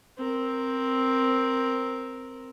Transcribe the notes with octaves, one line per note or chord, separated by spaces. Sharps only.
C4 A#4